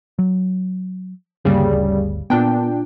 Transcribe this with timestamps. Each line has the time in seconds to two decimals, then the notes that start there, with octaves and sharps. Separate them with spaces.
0.19 F#3
1.45 D2 G2 C#3 G3 A#3
1.71 G1 D2
2.30 A#2 B3 D4 G5